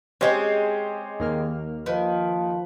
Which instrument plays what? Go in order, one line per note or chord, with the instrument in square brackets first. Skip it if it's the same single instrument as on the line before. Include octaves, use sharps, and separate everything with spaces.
[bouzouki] G#3 C4 [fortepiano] C#4 G4 C5
[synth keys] D#2 A#3 F6
[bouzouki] D#3 [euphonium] F3 [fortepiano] B4